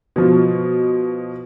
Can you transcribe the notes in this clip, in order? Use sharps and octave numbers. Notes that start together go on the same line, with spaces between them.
B2 F3